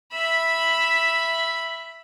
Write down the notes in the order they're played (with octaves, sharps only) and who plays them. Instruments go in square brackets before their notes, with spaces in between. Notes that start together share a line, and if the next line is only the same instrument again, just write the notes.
[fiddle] E5 B5